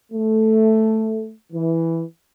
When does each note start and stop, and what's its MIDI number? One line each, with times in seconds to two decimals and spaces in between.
0.12 1.31 57
1.53 2.03 52